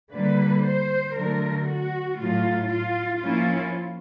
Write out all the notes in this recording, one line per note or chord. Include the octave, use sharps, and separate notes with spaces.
D3 G3 A#3 B4
C5
D3 F#3 A3 A#4
F#4
A2 F#3 A3 F4
F4
F3 A#3 C#4 E4 F4